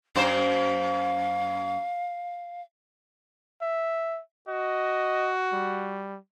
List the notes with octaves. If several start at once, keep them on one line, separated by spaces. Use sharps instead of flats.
F#2 A#3 C5 F5
E5
F#4 D#5
G3